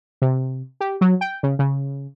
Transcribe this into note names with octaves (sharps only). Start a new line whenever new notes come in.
C3
G4
F#3
G5
C#3
C#3